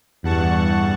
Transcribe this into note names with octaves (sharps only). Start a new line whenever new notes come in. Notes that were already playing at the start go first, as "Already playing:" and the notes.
E2 G2 F#5 A5 C#6